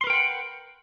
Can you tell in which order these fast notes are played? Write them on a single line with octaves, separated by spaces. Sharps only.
C6 B4 A#4 G5 F#5